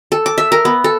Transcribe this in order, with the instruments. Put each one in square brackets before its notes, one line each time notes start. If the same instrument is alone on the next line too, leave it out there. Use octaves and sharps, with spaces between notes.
[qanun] A4
D6
E5
A#4
B3
A4